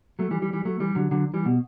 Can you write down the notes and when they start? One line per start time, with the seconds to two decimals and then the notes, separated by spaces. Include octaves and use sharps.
0.19 F#3 A3
0.31 E3 G3
0.42 E3 G3
0.53 E3 G3
0.65 F#3 A3
0.80 E3 G3
0.95 D3 F#3
1.11 D3 F#3
1.34 E3 G3
1.45 B2